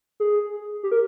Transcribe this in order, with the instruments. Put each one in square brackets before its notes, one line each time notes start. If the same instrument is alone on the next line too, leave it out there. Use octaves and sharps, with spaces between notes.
[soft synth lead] G#4
G4
A#4